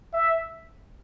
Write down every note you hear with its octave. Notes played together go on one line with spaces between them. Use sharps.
E5